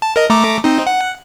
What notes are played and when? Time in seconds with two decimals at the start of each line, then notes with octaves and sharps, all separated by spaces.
0.02 A5
0.16 A#4 D#5
0.30 A3 A#5 D6
0.64 C4 D#4
0.87 F#5